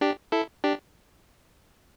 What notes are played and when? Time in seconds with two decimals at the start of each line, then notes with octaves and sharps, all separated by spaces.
0.01 D4 G4
0.32 E4 A4
0.64 D4 G4